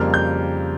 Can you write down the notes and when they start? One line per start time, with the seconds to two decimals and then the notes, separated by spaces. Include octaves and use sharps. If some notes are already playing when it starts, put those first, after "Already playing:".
Already playing: F2 C#3 G3 A#3 F6
0.14 G6